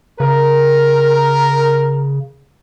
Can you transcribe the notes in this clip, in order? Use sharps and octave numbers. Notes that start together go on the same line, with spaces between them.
C#3 A#4